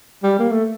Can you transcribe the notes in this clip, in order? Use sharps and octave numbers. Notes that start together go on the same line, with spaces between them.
G3
A#3
A3